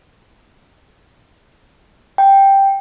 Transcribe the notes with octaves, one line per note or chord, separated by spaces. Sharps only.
G5